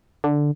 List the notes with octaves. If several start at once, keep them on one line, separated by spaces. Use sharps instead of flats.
D3